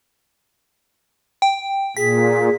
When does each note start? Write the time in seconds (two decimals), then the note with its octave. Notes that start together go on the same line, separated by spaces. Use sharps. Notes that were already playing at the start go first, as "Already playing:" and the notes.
1.42 G5
1.97 A#2 G#4 B6